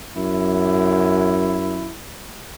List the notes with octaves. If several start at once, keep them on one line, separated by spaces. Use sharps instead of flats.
F#2 E4